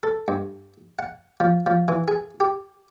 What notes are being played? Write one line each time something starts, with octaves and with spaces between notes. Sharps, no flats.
A4
G2
F#5
F3
F3
E3
G#4
G4